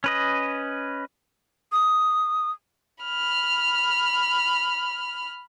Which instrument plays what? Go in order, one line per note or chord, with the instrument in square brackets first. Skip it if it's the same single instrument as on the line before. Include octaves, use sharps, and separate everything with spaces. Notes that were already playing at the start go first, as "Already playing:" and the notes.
[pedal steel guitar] C#4 B4 D#5
[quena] D#6
[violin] B5 F6